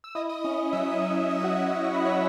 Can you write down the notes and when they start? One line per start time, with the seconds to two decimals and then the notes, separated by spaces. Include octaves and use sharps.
0.04 E6
0.15 E4 D#5 D#6
0.29 D#5 D#6
0.44 C#4 D#5 D#6
0.72 F#3 E5 E6
1.02 F#3
1.30 F#3 D#5 D#6
1.44 F#4 F#5
1.59 F#3 E4 E5
1.73 D#6
1.84 F#3 C#6
1.94 B5
2.05 C#5 C#6